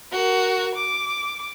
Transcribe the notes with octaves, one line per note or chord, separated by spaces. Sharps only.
F#4 A#4
D6